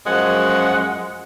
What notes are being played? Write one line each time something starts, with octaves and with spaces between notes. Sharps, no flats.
F#2 F3 G#3 F#5